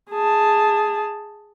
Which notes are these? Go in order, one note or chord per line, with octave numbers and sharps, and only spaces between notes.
G#4 A5